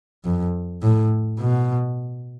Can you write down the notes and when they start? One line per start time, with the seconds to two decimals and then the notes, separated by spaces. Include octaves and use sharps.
0.25 F2
0.82 A2
1.40 B2